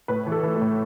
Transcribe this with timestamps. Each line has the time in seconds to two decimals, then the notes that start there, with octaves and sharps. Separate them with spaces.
0.08 A2 B4
0.27 E3
0.32 A4
0.43 E3
0.56 A3
0.61 A2